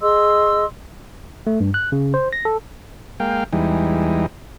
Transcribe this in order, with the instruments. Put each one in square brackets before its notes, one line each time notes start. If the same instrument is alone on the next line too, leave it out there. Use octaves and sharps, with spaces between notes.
[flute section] G#4 D#5 C6 E6
[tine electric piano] A3
G2
F#6
C#3
C5
A#6
A4
[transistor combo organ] G#3 A#3 F5 G5
E2 E3 G3 G#3 D#4